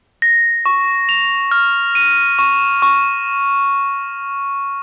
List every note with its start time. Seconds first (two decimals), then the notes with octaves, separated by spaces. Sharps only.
0.22 A#6
0.66 C#6
1.09 F7
1.51 F6
1.95 D#7
2.39 C#6
2.82 C#6